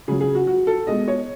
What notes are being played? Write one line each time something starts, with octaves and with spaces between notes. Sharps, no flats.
C#3 F#3 G#4
G#4
F#4
F#4
A4
B2 G#3 D#5
C#5